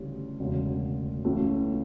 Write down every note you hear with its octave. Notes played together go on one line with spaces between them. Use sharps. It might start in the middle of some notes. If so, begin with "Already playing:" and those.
Already playing: D2 C#3 E3 G3 C#4
E1 D2 C#3
C#2 C#3 E3 A3 C#4